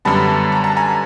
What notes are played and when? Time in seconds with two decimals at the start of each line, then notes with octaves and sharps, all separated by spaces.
0.05 F#2 D3 G3 B3 A5 B5
0.52 A#5
0.64 A5
0.77 G#5 A#5